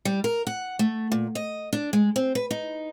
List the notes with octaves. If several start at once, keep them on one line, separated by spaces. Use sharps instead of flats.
G3
A#4
F#5
A3
A#2
D#5
D4
G#3
C4
B4
D#4